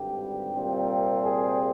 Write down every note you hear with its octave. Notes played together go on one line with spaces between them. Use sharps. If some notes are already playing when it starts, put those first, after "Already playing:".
Already playing: G#1 G2 D3 G4
C2 A#2 G3 C4
G#4